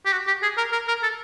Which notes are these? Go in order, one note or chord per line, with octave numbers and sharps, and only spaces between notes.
G4
F#4
G4
G#4
A#4
A#4
A#4
A4